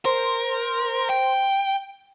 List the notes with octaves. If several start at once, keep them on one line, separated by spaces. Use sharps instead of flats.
A#4 C5
G5